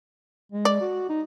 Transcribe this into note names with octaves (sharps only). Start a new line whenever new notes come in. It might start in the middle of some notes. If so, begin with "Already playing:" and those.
G#3
D5
F#4
D#4